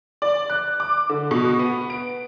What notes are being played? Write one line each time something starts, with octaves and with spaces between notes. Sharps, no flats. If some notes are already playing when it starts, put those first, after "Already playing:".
D5
F#6
D6
D3
B2
B3
D7